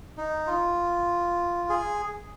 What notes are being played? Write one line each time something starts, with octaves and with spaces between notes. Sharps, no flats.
D#4
F4
G#4